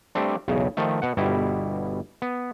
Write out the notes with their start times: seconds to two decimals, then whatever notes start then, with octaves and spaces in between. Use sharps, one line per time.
0.15 G3 A3 C4 D4
0.48 B1 E2 C#3
0.77 D#3 F3 A3
1.02 B2 F#5
1.17 G1 B2 G3 E4
2.22 B3